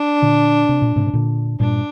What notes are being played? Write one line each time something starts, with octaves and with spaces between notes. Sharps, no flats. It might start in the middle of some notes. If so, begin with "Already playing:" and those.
Already playing: D4
A#2 D3
C3
A#2
G#2 C3
C3
A#2 D3
G2 A#2 D4